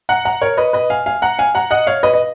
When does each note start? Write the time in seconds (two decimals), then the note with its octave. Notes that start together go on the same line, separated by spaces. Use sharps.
0.09 F#5 A#5
0.25 F#5 A#5
0.41 A#4 C#5
0.57 B4 D#5
0.73 B4 D#5
0.90 F5 G#5
1.06 F5 G#5
1.22 F#5 A#5
1.39 F5 G#5
1.55 F#5 A#5
1.71 D#5 F#5
1.87 C#5 F5
2.03 B4 D#5
2.14 D#5